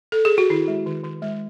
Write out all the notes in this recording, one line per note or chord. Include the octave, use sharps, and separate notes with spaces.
A4
G#4
F#4
D#3 E4
G#3
D#3
D#3
G#3